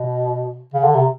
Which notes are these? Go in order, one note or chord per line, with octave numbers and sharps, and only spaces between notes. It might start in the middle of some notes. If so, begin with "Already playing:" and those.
Already playing: B2
C#3
D3
C3